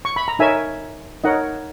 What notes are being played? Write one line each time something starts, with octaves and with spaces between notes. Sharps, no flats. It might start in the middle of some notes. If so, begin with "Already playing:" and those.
C#6
B5
A#5
D#4 A#4 C#5 E5 G#5
D#4 A#4 C#5 D#5 F#5